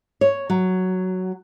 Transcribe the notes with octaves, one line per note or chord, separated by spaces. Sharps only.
C#5
F#3